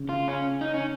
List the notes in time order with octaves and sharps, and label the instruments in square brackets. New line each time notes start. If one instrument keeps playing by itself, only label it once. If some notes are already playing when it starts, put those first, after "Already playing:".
Already playing: [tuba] C#3
[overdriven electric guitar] F4
C#4
D#4
C#4